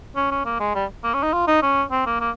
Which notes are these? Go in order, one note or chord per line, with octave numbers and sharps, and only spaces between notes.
C#4
C#4
A#3
G#3
G3
A#3
C#4
D#4
F4
D#4
C#4
C4
A#3
A#3